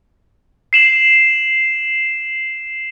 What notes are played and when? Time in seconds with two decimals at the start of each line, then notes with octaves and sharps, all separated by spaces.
0.73 C7 E7 F#7